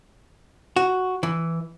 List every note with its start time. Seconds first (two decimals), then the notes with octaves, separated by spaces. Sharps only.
0.76 F#4
1.23 E3